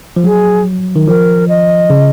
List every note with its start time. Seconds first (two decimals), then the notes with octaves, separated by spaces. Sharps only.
0.16 F3
0.24 F#3 G#4
0.96 D#3
1.08 F3 A#4
1.49 D#5
1.90 C#3